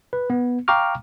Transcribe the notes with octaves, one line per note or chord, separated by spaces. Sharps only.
B4
B3
F5 G5 A#5 C#6 D6 F6